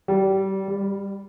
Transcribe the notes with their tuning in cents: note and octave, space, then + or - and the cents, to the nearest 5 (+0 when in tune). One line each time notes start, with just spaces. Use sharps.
G3 -25
G3 +20